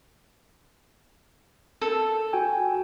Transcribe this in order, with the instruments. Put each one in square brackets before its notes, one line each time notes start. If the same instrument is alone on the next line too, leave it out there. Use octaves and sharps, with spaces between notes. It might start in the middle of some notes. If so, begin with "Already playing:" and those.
[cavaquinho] A4
[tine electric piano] F#4 G5 G#5